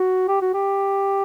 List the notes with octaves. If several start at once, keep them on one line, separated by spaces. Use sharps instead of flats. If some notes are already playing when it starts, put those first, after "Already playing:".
Already playing: F#4
G4
F#4
G4